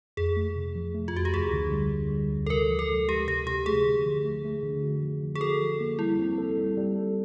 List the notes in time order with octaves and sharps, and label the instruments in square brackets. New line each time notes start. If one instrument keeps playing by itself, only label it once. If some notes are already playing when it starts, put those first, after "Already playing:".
[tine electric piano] F2 [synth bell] G#4
[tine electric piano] A3
C3
F3
A3
[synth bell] F4
[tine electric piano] F2 [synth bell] F#4
[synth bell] G4
[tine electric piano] D2 [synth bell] G#4
[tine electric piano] D3
G3
D3
G3
D2
[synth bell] A4
[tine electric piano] C3 [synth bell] A#4
[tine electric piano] F3
[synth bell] A4
[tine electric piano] G#3
[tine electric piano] G#3 [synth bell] G4
[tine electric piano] C3 [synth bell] G4
[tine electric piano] C3 [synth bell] G4
[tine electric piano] A3 [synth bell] G#4
[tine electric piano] D3
F3
A3
A3
D3
F#4
F3
F3
[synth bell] G#4
[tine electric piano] F#4 [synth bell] A4
[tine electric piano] F3
A#3
[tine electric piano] G3 [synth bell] E4
[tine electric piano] C4
A4
G3
G3
A4